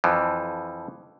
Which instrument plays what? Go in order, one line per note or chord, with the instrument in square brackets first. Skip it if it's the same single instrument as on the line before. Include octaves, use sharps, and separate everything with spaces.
[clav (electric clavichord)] F2 E3 F3